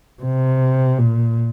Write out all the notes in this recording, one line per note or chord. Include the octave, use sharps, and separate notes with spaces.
C3
A#2